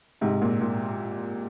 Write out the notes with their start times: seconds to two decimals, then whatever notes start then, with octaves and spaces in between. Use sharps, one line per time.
0.21 G#2 C3
0.41 A#2
0.61 A#2